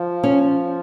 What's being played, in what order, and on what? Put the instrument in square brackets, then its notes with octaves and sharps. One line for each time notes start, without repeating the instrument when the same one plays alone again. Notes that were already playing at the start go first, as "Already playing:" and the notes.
Already playing: [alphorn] F3
[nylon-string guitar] C#4